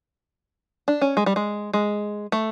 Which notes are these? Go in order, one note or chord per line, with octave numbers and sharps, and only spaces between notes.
D4
C#4
G#3
G3
G#3
G#3
A3